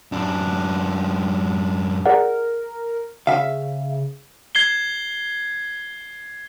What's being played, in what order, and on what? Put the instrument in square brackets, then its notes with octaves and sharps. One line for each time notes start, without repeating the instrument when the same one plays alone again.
[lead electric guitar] F#2 D4
[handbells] G#4 D5 F#5 [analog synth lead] A#4
[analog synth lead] C#3 [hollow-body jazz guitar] E5 F5
[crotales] G#6 C7 G7